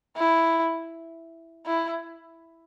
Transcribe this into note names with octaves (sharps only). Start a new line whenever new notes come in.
E4
E4